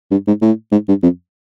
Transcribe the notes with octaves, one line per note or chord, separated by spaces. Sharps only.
G2
G#2
A2
G#2
G2
F2